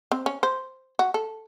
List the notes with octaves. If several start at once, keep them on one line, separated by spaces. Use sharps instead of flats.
C4
C#4
C5
F#4
A4